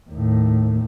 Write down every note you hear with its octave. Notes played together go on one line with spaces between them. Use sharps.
D#2 A2